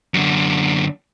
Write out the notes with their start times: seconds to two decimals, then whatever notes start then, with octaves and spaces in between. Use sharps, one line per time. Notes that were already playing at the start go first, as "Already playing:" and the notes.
0.14 F#2 D3